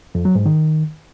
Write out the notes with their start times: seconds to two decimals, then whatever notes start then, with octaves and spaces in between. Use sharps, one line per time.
0.15 F2
0.25 F#3
0.35 G#2
0.46 D#3